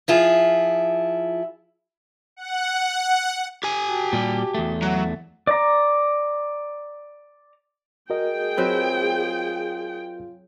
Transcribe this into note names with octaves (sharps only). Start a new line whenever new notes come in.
F3 E4 F4 G#4
F#5
G4 G#5
F#4 G5 A5
A#2 G3
E2 A3
F#3 F#5
D5 A#5
F#4 G#4 A#4 D#5 G5
F#3 C4 F4 B4